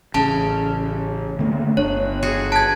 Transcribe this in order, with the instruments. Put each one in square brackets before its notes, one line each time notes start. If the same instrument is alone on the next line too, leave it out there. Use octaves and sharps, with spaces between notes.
[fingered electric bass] A1 [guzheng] C#3 [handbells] A5
[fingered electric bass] D3 A3 A#3
[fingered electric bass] G1 D4 [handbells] C#5
[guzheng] F#4 G#4
[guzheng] B4 [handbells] A5 G#6